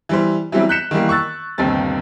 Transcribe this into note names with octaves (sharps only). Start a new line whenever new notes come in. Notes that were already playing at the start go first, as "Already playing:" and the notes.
E3 G3 C5
E3 F#3 G3 C4 E4
F#6 G6 B6 C#7 E7
D#3 E3 G3 A#3
C#6 E6 F#6 A6
G1 D#2 C3 D#3 C4 A6